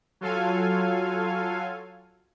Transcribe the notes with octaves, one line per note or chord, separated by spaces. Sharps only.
F#3 F4 A4 F5 G#5